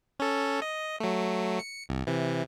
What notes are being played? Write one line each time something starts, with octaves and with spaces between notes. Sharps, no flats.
C#4 A4
D#5
F#3 A3
C#7
C2
C3 E3